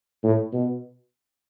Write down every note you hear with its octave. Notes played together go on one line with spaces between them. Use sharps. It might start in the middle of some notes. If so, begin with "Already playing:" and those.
A2
B2